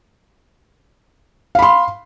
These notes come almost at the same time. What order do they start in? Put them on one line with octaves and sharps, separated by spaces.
F5 B5 C6